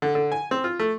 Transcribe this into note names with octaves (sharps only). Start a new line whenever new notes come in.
D3
D3
G#5
C4
F4
A3